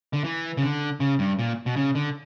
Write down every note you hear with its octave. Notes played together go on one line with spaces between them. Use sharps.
D3
E3
C#3
D3
C#3
G2
A#2
B2
C#3
D3